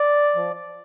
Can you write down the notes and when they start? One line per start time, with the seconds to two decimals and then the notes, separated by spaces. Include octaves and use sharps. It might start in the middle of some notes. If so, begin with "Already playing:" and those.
Already playing: D5
0.35 F3